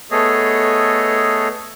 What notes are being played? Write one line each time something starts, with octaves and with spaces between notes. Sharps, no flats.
A3 B3 G#4 A4 C#5 D#5